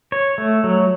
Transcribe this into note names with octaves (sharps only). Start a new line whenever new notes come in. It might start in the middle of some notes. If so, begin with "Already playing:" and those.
C#5
A3
F#3